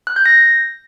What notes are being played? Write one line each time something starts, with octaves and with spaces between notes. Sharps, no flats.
F#6
G6
A#6